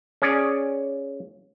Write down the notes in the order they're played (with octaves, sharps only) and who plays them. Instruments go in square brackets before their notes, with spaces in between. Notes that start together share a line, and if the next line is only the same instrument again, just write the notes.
[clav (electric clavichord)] C#4 G#4 C#5 D5